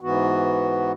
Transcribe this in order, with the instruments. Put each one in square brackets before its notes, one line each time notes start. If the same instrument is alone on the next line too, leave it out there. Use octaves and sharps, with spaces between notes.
[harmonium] G#2 E3 B3 F#4